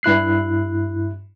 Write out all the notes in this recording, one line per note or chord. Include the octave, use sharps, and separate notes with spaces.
G2 E4 F#6 C7